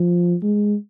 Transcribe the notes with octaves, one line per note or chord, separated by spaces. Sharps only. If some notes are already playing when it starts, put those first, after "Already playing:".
Already playing: F3
G#3